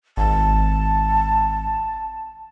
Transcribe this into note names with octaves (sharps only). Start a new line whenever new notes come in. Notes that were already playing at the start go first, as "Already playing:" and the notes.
G#1 A5